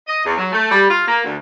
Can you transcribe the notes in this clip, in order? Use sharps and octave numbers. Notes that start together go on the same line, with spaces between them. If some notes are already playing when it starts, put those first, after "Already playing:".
D#5
E2
F#3
A3
G3
F4
A#3
D2